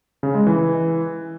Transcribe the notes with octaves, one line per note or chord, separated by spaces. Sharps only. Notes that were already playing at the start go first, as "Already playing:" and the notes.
C#3
G#3
E3